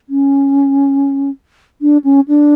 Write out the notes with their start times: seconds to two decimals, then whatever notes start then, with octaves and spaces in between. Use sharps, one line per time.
0.09 C#4
1.81 D4
2.04 C#4
2.28 D4